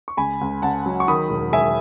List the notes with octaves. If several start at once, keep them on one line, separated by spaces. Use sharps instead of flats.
C#6
C#2 G#5 B5
C#2
C#2 F#5 A5
F#3
C#6
D#3 B5 D#6
E1
E1 E5 G#5